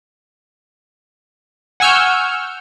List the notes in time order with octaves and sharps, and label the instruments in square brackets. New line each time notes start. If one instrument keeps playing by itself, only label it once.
[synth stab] F#5 G#5 C#6 E6 F6 G6